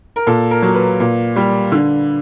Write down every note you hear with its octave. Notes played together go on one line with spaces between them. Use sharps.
A#4
A#2 A4
A#4
F#3
B4
A#2
G3
D3